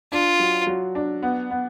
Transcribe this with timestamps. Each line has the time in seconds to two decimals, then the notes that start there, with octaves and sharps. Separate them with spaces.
0.12 D4 F4
0.40 F#3
0.67 F#3
0.95 D4
1.23 B3
1.51 B3